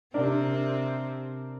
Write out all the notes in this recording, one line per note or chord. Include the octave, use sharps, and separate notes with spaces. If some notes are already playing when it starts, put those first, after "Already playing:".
C3 C4 D4 A#4 D5